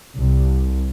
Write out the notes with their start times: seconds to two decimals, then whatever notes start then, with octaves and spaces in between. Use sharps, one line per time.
0.18 C2